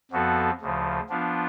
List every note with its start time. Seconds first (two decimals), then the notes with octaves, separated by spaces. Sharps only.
0.11 F2 F3 B3 F#4 A4
0.61 D2 C#3 F3
1.09 F3 B3 D4 F4